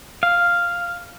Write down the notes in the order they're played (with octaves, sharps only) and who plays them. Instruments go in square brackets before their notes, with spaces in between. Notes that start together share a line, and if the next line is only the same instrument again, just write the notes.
[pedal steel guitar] F5